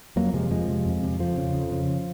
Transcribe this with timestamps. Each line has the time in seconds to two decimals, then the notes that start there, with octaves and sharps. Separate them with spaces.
0.16 F2 F#3 A#3
0.34 C3 F3 G#3
0.51 F2 F3 G#3
0.68 C3
0.86 F2
1.03 C3
1.19 F2 F3
1.37 C#3
1.55 F2
1.72 C#3